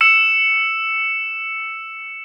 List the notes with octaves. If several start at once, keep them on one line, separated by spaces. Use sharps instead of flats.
E6 C#7 E7